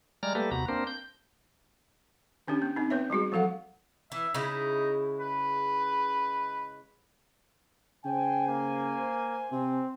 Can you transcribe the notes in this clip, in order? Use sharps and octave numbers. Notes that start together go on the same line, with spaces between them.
G3 G#3 D5 A#5 F6
G3 A3 A#3 G4 A4 B4
D#2 C3 B3 F#4 A#5
A#3 C4 D4 A#4 C5
G6
D#3 C#4 D4 G4
B3
C4 D#4
B3 B4 C#5 E5
G3 G#3 F#4 G#4
F3 F#3 A4 F5 F#5
E3 E5
C#3 G#3 D#4 E4
B4
C#3 C5 G5 G#5
A#3
C3 C4